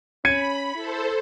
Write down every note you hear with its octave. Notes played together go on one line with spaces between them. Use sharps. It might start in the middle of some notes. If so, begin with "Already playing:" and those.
C#4 B5 G#6 C#7 D#7
E4 A4 C5